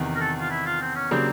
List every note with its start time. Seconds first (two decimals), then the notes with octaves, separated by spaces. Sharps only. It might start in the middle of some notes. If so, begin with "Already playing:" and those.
Already playing: E2 C3 D#3
0.16 A#4
0.20 A4
0.41 F4
0.50 E4
0.66 F4
0.81 C4
0.96 C#4
1.11 C#3 F#3 A#3 C4 D4 G4